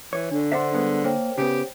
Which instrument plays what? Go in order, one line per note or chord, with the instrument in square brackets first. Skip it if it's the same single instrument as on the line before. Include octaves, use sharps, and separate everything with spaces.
[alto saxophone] E3 [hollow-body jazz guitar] C#5
[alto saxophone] D3 [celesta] D4
[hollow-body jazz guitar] D4 A4 E5 [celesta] C5 F#5 C6
[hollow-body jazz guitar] G2 G#3 B3
[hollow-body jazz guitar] A#3 [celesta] C5 C#5 G5
[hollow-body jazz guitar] C#3 B3 [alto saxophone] G4